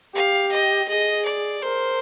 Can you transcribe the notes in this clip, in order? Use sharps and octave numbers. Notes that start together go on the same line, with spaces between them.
G4 F5
D#5
G#4 D#5
D5
A#4 C5